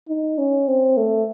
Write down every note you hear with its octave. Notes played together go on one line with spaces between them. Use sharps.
D#4
C#4
C4
A3